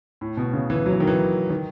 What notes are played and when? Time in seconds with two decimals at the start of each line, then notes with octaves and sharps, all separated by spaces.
0.21 A2
0.37 B2
0.53 C#3
0.70 E3
0.86 F#3
0.93 E3
1.00 D#3
1.07 E3
1.50 D#3